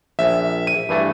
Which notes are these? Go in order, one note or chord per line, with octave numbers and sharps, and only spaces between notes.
A#1 E5
D#7
G2 E3 A3